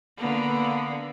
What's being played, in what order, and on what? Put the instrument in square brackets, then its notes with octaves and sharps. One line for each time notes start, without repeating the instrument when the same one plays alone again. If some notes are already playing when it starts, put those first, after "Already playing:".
[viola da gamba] D3 A#3 B3